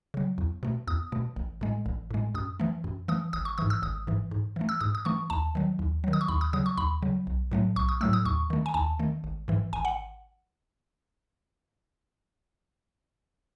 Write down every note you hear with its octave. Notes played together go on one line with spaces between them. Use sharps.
C#3 F#3
E2
B2 A3
E2 D#6
B2 A3
A1
A2 G#3
A1
A2 G#3
F#2 D#6
E3 A3
F#2
E3 A3 D#6
G#1 D#6
C#6
G#2 E3 D#6
E6
G#1 D#6
G#2 E3
G#2
E3 A3
E6
G#2 D#6
D#6
E3 A3 C#6
D#2 A5
D#3 F#3
D#2
D#3 F#3
D#6
C#6
D#2 B5
D#6
C#3 F#3 D#6
C#6
D#2 B5
C#3 F#3
B1
A2 F#3 A3
B1 C#6
D#6
A2 F#3 A3 E6
D#6
D#2 C#6
D#3 A3
G#5
D#2 A5
D#3 A3
G#1
G#2 E3
G#1 G#5
F#5